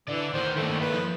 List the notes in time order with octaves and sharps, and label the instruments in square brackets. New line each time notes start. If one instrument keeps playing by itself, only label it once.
[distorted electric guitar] D3 [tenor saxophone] E3 [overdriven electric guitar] D5
[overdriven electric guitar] D2 B3 [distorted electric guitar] D#3 [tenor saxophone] C5
[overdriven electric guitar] G2 D#3 [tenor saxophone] A3 [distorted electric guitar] A#3 E4
[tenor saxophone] B4
[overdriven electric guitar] F3